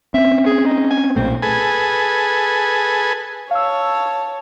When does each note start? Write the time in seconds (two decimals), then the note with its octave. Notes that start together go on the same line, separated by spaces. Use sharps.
0.14 C4 C#4 E5
0.46 G#4
0.66 D#4
0.91 G#5
1.16 B1 A#2 A3 C4
1.42 G#4 A4 B4 G#5
3.51 C#5 F5 A5 E6